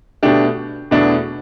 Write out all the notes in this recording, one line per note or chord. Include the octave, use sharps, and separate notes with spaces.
B2 A3 D4 G4
E2 B2 A3 D4